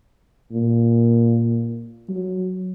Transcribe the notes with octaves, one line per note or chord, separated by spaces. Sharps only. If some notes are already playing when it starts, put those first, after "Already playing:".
A#2
F#3